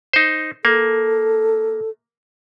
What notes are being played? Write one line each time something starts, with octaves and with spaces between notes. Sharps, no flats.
D#4 C5
A#3 A4